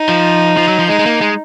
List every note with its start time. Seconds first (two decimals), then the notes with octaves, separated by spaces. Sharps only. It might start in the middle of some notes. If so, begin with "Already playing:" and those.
Already playing: D#4
0.09 F3
0.57 F3
0.68 F#3
0.79 F3
0.89 G#3 D#4
0.99 G#3
1.06 A#3
1.21 G#3